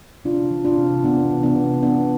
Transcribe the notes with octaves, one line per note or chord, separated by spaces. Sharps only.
C3 D4 F4
E3
D4 F4
C3
E3 B3 D4
C3
B3 D4
C3
G#3 B3 D4